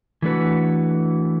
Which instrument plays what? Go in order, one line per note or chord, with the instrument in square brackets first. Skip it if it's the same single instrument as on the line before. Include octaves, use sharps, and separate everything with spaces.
[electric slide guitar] E3 A3 D4 F#4 B4